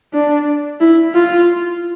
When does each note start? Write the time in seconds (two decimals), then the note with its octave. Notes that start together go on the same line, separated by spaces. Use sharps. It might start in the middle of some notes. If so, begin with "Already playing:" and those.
0.14 D4
0.80 E4
1.14 F4